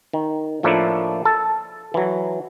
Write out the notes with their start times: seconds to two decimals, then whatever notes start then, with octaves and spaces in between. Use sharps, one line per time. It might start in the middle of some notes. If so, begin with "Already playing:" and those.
0.13 D#3
0.63 A2 F3 A3 A#3 D4 E4
1.25 A4
1.94 E3 F#3